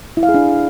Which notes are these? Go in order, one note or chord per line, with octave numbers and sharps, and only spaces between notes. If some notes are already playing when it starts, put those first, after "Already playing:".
E4
F5
G#4
D4